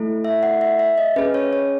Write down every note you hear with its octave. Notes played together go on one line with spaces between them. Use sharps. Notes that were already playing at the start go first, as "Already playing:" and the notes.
Already playing: A3 E4 A4
E5
F#5
E5
E5
D#5
C#4 G#4 B4
C#5
C#5